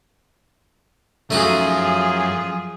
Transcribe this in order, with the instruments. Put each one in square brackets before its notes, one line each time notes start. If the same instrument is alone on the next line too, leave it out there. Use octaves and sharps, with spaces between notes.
[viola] F3 G#4 [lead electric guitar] F#3 C#4 [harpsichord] A3 D#4 F#4